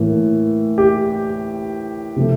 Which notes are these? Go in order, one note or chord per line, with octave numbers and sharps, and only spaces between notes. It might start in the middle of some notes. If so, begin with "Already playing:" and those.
Already playing: A2 E3 A#3
G4
C3 F3 A3